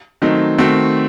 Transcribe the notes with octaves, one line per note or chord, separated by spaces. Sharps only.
D#3 F#3 A3 C4 D#4
D#3 A3 C4 F#4